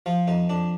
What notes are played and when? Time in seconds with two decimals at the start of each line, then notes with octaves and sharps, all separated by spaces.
0.06 F3 F4
0.28 F2 D#4
0.49 F2 D4